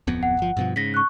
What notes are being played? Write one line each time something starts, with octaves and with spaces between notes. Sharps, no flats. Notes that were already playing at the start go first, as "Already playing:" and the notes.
D1 F2 B3
F#5
G1 F3
G2 B2 F3
G#2 C#3 A#6 B6
C#6 F#6